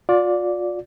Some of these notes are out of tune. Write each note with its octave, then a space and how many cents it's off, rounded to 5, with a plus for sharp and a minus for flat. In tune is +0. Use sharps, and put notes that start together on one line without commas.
F4 +35 D5 -10